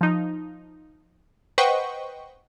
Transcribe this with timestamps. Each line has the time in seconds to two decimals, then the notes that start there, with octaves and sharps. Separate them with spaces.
0.01 F3 D#4
1.58 B4 C5 D#5 F#5 G5 C#6